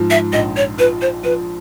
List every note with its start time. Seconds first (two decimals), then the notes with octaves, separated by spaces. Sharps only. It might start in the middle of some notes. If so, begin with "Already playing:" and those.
Already playing: G#2 F3
0.10 E5
0.33 A#1 D#5
0.56 C#5
0.78 F3 B4
1.01 C5
1.23 F3 B4